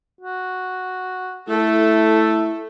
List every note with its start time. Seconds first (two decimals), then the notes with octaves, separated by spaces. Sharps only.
0.21 F#4
1.49 A3 E4 A4